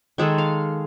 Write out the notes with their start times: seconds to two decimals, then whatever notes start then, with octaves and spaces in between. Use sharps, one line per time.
0.18 D#3 G#3 G#4 A4
0.38 F5